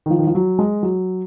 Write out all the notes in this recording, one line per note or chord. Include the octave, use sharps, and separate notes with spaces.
D#3
F3
D#3
F3
F#3
G#3
F#3